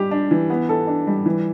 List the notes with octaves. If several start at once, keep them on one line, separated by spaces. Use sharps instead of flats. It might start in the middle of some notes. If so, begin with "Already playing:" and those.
Already playing: G3 G4
D4
E3
B3
A4
D4
G3
E3